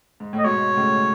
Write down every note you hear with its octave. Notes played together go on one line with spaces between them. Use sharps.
G#2
A2
D#5
G#2 B2 C#5
A2 C#3